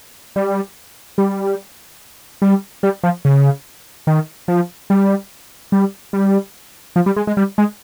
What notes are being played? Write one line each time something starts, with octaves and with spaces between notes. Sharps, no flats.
G3
G3
G3
G3
F3
C#3
D#3
F3
G3
G3
G3
F3
G3
G#3
G#3
G3
G#3